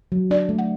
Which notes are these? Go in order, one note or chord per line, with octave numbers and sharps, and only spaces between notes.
F#3
D4 D5
A3
F#5